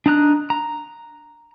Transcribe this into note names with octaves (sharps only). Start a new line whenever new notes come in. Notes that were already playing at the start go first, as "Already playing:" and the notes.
D4 D#4 A#5 F#6
A#5